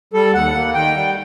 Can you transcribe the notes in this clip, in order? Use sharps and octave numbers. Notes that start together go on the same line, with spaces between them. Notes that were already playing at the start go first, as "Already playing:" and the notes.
G3 A4
D#2 F#5
A#3
D#3 G5
G3